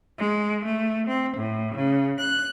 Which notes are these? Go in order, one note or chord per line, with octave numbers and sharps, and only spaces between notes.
G#3
A3
C4
A2
C#3
F#6